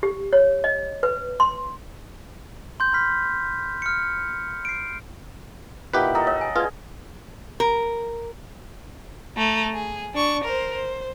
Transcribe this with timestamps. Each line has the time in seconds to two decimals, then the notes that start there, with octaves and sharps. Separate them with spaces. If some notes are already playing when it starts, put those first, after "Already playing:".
0.03 G4
0.33 C#5
0.64 D#5
1.03 B4
1.40 C6
2.80 C6 G6
2.93 B5 F6 B6
3.82 F6 C#7
4.65 C7 D7
5.94 A#2 D#4 E4 G4 B4 F#5
6.15 A4 D#5 A#5
6.27 C#5 D#5
6.41 G#5
6.56 F4 G#4 B4 D5
7.60 A#4
9.37 A3 A#5
9.74 G#4
10.14 D4 C#6
10.44 A#4 C5
10.75 C5